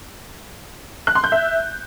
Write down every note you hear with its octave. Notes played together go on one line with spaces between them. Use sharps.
F#6
C6
G6
E5